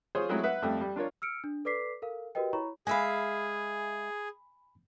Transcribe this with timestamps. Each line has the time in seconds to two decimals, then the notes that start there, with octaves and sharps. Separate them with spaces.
0.15 F4 G#4 C5 C#5
0.29 F#3 G#3 A3 C4 E4 C#5
0.43 B4 E5 F#5
0.62 F2 G3 A3
0.81 G3
0.96 D4 F4 A#4 C#5
1.22 E6 F6 C#7 D7
1.44 D4
1.65 A4 B4 D5 D6 B6 C7
2.02 A4 A#4 F5
2.35 F#4 G4 A#4 B4 D#5 G5
2.53 E4 C#5 A#5 B5 C#6
2.87 G#3 G#4 E5 F5 G#5 B5